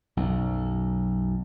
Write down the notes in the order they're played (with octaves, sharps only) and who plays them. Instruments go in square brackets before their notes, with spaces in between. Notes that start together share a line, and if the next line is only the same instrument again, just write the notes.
[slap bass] B1 F#2